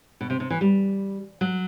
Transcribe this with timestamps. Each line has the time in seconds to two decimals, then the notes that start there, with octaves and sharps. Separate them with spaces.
0.21 B2
0.30 C3
0.40 C3
0.50 E3
0.61 G3
1.41 F#3